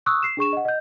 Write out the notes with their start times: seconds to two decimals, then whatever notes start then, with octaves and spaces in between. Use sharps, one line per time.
0.06 C#6 D#6 E6 F#6
0.23 C7 E7
0.37 D4 G#4 C#6 E7
0.53 D#5 F#5
0.65 D#5 G6